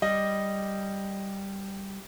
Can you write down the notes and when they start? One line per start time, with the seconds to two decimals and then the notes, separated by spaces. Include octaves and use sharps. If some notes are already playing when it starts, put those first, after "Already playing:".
0.02 G3 D#5